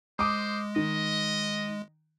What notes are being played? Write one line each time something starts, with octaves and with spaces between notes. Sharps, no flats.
G#3 C5 D6 D#6
D#3 D#5